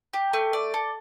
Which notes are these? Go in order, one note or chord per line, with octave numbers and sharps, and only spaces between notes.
G4
A3
D5
A4